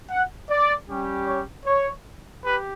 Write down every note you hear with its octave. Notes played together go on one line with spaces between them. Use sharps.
F#5
D5
G3 C#4 G4
C#5
C#5
G4 B4